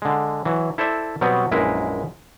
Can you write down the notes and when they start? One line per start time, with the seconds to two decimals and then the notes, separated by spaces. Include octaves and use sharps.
0.02 D3 G#3
0.45 E3 F#3
0.78 E4 A4 C5 D5 E5
1.21 B2 F#3 G3 B3 C4
1.51 A#1 F#2 G#3 E4 A#4 B4